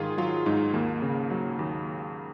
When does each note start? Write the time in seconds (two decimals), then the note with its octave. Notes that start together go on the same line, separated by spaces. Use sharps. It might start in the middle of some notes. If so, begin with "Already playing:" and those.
Already playing: G#2 D#3 F4 G#4
0.18 F#3 F4
0.46 G#2 D#4
0.74 D#2 A#3
1.02 C#3
1.30 F#3
1.59 D#2